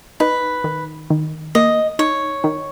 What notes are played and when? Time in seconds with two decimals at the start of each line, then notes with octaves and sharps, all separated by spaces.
0.20 D#4 B4
0.64 D#3
1.10 D#3
1.55 A#3 D#5
1.99 D#4 C#5
2.44 D#3